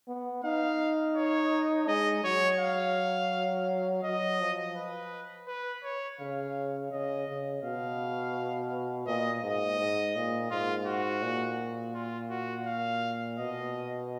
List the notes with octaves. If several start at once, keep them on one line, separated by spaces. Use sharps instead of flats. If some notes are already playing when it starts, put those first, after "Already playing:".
B3
D#4 F5
C#5
G#3 D#5
F#3 C#5
F5
F#3 D#5
F3
B4
B4
C#5
C#3 F5
C#3 D#5
C#3
B2 F5
A#2 D#5
G#2 D#5
G#2
A#2
G#2 F4
F#4
A#2
F4
F#4
F5
B2 D#5